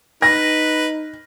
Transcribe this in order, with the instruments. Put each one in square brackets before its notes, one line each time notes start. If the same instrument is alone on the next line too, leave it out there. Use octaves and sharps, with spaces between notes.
[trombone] D#4 [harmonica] B4 [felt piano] A#6